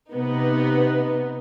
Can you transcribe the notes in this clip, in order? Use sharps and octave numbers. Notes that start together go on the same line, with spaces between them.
C3 B3 D#4